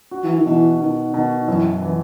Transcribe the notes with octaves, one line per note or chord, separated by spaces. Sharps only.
F#4
E3
D#3
B2 E3
B2 D#3
B2 D#3
F#2 E3
E3